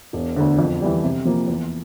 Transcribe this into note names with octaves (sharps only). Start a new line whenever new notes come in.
E1
D2 D3
F2
E3 G3
C3
F3 A#3
E2